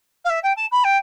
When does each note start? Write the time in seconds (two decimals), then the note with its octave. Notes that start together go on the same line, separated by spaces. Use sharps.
0.24 F5
0.29 E5
0.43 G5
0.56 A5
0.71 B5
0.84 G5